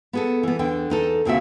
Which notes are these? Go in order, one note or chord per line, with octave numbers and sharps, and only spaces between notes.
B3 G#4 A4
E3 B3
E2 D3 G5
E2 D#4 A4
D#2 A#2 C#3 C4 F#4 E5